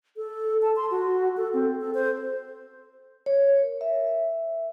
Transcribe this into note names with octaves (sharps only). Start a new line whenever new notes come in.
A4
A5
C6
F#4
A4
C4
A4
C5
C#5
A#4
E5